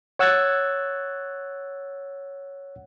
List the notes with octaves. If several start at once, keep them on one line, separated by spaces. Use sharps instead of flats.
C#5 F#5 E6 F#6 G#6 A6